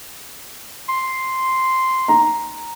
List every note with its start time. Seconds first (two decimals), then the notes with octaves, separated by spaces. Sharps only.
0.89 C6
2.08 A#5